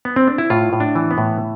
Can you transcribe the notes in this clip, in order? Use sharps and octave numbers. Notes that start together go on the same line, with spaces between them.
B3
C4
D4
E4
A2 F4
A2
D4
E3
B3
A2